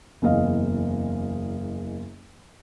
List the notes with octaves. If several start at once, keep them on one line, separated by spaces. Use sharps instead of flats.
F#1 E2 D#5 F5